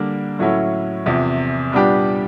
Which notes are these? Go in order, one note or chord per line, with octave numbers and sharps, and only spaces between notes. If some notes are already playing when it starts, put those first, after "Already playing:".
Already playing: D3 G3 A#3 D4
A2 F#3 A3 C#4 E4
E2 C3 F3
A#2 G3 B3 D4 G4